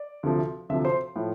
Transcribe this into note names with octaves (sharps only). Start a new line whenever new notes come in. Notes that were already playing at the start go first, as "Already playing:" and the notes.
Already playing: D5
D2 C3 F3
D2 C3 F3 E5
C5
A2 F3